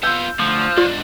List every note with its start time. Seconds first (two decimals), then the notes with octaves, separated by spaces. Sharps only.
0.03 B3 F4 E6 G6
0.40 D2 F3
0.78 G#2 D4 F4